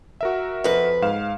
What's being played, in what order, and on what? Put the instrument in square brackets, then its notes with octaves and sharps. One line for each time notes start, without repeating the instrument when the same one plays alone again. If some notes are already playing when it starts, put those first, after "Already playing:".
[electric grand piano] F#4 A#4 E5
[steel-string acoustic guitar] F2 B4
[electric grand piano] G#2 F5 E7